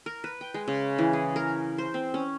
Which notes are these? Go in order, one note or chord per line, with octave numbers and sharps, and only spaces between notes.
A#4
B4
G5
G#3
C#3
E3
G#4
A#4
C5
C4
C#4